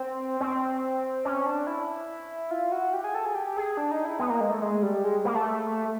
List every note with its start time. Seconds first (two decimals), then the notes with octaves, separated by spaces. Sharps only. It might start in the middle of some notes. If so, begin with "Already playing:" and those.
Already playing: C4
0.41 C4
1.25 C#4
1.46 D4
1.67 E4
2.51 F4
2.72 F#4
2.93 G4
3.04 G#4
3.15 A4
3.25 G#4
3.35 G4
3.57 G#4
3.77 D4
3.91 D#4
4.05 E4
4.19 B3
4.30 A#3
4.41 G#3
4.51 A3
4.62 G#3
4.83 G3
5.04 G#3
5.25 A#3
5.35 A3